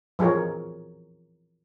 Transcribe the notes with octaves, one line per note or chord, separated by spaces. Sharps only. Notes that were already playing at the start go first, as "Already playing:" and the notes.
E3 F3 G#4 A#4 C#5